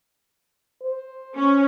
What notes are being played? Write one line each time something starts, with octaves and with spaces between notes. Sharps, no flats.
C5
C#4